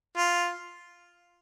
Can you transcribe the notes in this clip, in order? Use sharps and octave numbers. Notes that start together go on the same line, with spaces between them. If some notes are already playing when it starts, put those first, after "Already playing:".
F4